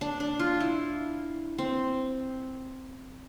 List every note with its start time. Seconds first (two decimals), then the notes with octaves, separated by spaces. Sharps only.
0.01 D4
0.20 D4
0.40 F4
0.60 E4
1.58 C4